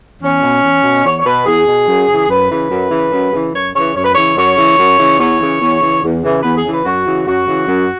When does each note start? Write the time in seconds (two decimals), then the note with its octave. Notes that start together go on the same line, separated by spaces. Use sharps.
0.21 E2 C#4
0.42 B2
0.63 E2
0.83 B2
1.04 E2 C#5
1.18 C#5
1.24 B2 B4
1.46 E2 G#4
1.66 B2
1.88 F#2
2.07 C#3 E3
2.28 F#2 B4
2.49 C#3 E3 B4
2.69 F#2
2.90 C#3 E3
3.11 F#2
3.32 C#3 E3
3.53 F#2 C#5
3.73 C#3 E3 C#5
3.94 F#2 C#5
4.03 B4
4.12 C#3 E3 C#5
4.36 F#2 C#5
4.56 C#3 E3
4.77 F#2
4.98 C#3 E3
5.19 E2 C#5
5.39 C#3 E3
5.60 E2
5.81 C#3 E3
6.02 E2
6.22 C#3 E3
6.42 E2 B4
6.56 G#4
6.64 C#3 E3 B4
6.84 F#2 F#4
7.05 C#3 E3
7.25 F#2 F#4
7.46 C#3 E3
7.67 F#2